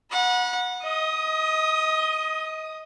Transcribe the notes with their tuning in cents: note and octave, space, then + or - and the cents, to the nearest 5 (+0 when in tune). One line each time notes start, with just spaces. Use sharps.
F#5 -25 B5 -40
D#5 +25 D#6 +0